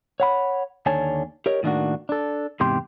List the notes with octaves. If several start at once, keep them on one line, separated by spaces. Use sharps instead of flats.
C#5 F#5 B5
D#2 D3 C#5 G#5 A5
G4 A#4 C#5 D#5
A2 D#3 G3 A#3 D4 F#4
D4 A4
E2 G#2 C3 G4 C6